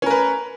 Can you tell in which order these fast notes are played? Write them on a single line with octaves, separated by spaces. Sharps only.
C#4 A#4 B4